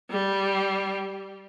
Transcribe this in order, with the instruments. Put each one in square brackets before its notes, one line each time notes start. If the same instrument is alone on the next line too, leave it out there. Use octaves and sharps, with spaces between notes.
[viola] G3